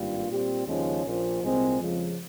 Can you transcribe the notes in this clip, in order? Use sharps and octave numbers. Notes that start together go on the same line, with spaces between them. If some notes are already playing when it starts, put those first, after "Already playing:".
Already playing: G#1 G2 G3 A#3 F4
A#2 G3 C4 G4
D#2 C#3 F3 G#3 C#4
A#1 A#2 F3
C2 A#2 G#3 C4
F2 C#3 F3 G#3